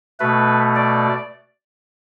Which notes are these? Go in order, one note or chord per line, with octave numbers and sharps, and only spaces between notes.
B2 A3 B4
D5